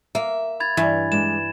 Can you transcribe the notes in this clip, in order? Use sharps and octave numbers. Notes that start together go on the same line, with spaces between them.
A#3 E5
B5 G#6 A6
G2 E3
G#3 D4 E7